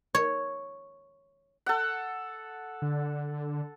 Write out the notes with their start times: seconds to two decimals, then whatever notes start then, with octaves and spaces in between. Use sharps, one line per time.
0.15 C#5
1.66 A4 F#5
2.82 D3